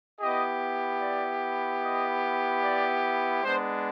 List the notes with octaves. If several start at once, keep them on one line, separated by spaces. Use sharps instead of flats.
B3 E4 G4 D#5
D5
D#5
D5
G#3 B3 D4 C5